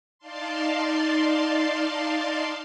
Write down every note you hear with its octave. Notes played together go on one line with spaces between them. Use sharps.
D#4 D5 F5 A5 C6